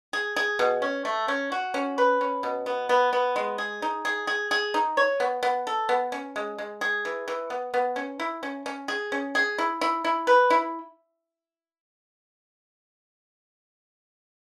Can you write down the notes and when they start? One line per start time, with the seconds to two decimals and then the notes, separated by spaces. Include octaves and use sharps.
0.13 G#4
0.36 G#4
0.59 B2
0.82 C#4
1.05 A3
1.28 C#4
1.52 F#4
1.74 C#4
1.98 B4
2.21 C#4
2.43 B2
2.66 B3
2.89 B3
3.13 B3
3.36 G#3
3.58 G#4
3.82 D#4
4.05 G#4
4.27 G#4
4.51 G#4
4.74 D#4
4.97 C#5
5.20 B3
5.43 B3
5.67 A4
5.89 B3
6.12 C#4
6.36 G#3
6.58 G#3
6.81 G#4
7.05 E3
7.28 E3
7.50 B3
7.74 B3
7.96 C#4
8.20 E4
8.43 C#4
8.66 C#4
8.88 G#4
9.12 C#4
9.35 G#4
9.58 E4
9.81 E4
10.05 E4
10.27 B4
10.50 E4